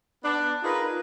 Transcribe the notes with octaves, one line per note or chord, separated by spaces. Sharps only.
B3 D4
D#4 F4 G#4 A#4 B4